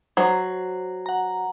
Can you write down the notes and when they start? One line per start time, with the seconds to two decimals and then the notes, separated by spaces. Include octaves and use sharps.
0.17 F#3 C5
1.06 F#5 A#5